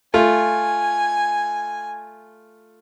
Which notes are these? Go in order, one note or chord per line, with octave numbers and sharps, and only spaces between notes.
A3 F4 G#5